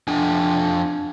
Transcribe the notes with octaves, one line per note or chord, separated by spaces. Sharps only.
F2 D4 G#5